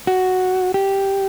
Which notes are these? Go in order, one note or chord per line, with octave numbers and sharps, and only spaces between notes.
F#4
G4